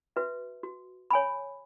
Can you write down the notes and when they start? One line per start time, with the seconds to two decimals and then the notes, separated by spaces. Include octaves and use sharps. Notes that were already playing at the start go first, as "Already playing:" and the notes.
0.16 F#4 B4 E5
0.63 F#4
1.11 C#5 G#5 B5